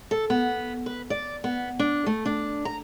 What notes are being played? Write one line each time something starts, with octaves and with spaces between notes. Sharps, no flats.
A4
B3
B4
D5
B3
D4
A3
D4
A#5